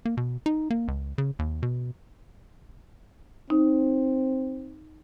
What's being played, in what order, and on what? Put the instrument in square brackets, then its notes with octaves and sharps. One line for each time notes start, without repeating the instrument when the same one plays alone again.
[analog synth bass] A#3
B2
D#4
A#3
C#2
C#3
D#2
B2
[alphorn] C4 [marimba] D#4